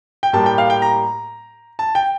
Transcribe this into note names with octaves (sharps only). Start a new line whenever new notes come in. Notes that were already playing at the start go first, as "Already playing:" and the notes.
G5
A2 G3 A#3 A5
G5
F5
G5
A#5
A5
G5